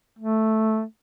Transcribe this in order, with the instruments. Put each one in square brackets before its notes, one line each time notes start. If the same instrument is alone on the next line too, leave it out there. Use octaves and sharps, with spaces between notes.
[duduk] A3